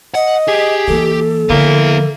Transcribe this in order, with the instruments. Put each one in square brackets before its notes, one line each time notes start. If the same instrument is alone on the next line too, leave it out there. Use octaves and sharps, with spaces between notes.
[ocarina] D#5 [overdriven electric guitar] F#5
[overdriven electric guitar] G4 [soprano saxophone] G#4
[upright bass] E3 A#3 [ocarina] A4
[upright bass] D3 F3 [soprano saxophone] A#3 [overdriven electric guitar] B3 E4